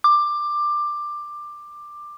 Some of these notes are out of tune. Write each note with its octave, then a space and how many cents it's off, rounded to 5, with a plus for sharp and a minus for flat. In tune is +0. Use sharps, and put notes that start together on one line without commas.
D6 +15